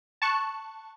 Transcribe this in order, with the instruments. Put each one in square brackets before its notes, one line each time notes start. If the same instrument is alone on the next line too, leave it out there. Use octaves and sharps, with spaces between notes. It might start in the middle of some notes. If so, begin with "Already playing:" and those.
[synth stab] A5 C#6 F#6